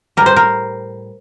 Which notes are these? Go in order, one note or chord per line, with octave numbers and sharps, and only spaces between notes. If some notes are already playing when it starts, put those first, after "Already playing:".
A2 G3 A#4
C5
A#4